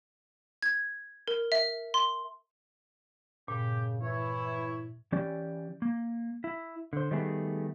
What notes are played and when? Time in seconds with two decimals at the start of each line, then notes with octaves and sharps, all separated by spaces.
0.62 G#6
1.28 A#4
1.52 E5
1.94 C6
3.48 G2 A#2 C#3 G4
4.02 E3 E4 C#5
5.12 E3 C#4 G4 D5
5.82 A#3
6.44 E4
6.93 D3 C5
7.11 D#3 G3 A3 B3 G#4